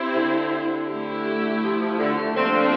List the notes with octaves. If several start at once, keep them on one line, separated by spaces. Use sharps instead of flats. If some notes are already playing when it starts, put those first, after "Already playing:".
Already playing: C4 E4 G4 C5
D3
A3 E4 G4
F3
F3
D3
A3
F3 A#3 C4 D4 F4 A4
C4